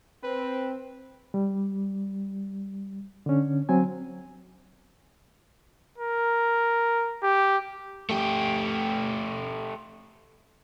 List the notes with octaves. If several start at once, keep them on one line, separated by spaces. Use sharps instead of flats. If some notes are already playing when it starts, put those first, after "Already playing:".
C4 B4
G3
D3 C#4
F#3 C4 G#5
A#4
G4
A3 G4